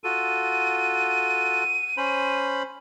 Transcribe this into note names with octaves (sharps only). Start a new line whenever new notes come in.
F4 F#4 A4 D#7
C#4 C5 B5